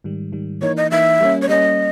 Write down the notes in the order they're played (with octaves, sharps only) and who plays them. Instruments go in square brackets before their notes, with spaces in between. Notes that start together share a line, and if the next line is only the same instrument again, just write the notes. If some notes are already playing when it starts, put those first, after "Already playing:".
[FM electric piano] G#2 D#3 G3
G#2 D#3 G3
[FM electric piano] E3 A#3 D#4 [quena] C#5
[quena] D#5
[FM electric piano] E3 A#3 D#4 [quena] E5
[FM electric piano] G3 A#3 C#4
[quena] C#5
[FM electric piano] G3 A#3 C#4 [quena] D#5